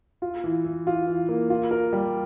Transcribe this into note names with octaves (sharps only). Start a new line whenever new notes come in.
F4
E3
E3
F4
E3
A#3
F4
A#4
G3